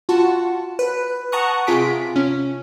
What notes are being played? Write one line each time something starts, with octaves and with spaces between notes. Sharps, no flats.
F4 F#4 F#5 A5
B4
F#5 A5 A#5 C#6 D#6 F#6
C3 F4 G#4 B6 D7
C#4